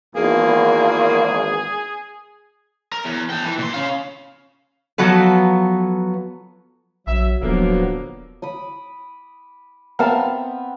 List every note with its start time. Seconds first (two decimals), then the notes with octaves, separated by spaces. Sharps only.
0.16 G#1 E2 A#3 G#4
2.92 A#4
3.05 E2
3.30 A4 G5
3.44 E3
3.58 A#2 C6
3.73 C#4 F5
4.98 F3 F#3 B3 A4 B4
7.07 A#1 F#3 E5
7.42 D#1 D3 F3 F#3 A#3 B3
8.42 B5 D6 D#6
9.99 B3 C4 A#4 E5 F5 A5